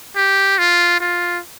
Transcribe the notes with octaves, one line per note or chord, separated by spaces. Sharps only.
G4
F4
F4